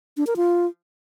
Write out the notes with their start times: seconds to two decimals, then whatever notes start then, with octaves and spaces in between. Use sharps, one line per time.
0.17 D4
0.27 A#4
0.36 F4